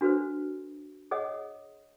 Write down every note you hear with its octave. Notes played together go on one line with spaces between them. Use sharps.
D4 F#4 A4 B4 C5
G#4 C#5 D#5 F#5 D#6